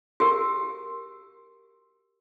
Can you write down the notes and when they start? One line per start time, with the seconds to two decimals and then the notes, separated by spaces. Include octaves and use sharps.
0.20 F#4 G4 A#4